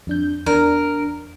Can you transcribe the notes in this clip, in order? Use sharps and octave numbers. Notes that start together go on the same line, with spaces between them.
F2 D4 G6
E2 D4 A#4